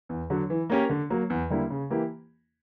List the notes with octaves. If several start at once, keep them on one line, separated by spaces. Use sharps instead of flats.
E2
D3 F#3
E3
A#3 C#4 G4 A#4
D3
F#3 A#3
E2
D3 G3 A#3 E4
C#3
E3 A#3 E4 G4